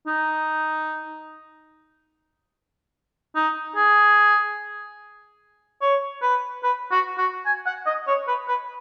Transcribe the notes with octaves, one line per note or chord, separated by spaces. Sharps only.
D#4
D#4
G#4
C#5
B4
B4
F#4
F#4
G#5
F#5
D#5
C#5
B4
B4